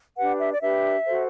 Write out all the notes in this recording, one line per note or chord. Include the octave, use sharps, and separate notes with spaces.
D4 G4 B4 F#5
E5
D5
D4 G4 B4 E5
F#4 A4 C5